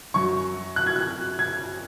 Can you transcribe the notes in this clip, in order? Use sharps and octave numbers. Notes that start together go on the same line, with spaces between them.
F#2 F#3 C#6
F#6
G#6
F#6
G#6